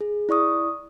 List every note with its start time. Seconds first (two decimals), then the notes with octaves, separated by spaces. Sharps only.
0.01 G#4
0.29 E4 D5 C#6 D#6